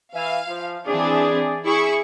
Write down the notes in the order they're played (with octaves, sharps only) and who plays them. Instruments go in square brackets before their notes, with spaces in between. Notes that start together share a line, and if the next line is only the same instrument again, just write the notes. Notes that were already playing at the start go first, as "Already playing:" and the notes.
[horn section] E3 E5 G#5 [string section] F5
[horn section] F3
[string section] E3 C4 D4 [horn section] G#4 D5
[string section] E4 C#6 [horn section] G#4